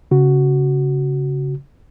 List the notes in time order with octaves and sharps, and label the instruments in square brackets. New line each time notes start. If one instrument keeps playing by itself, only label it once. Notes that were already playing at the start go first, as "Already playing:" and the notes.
[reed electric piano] C#3 F#4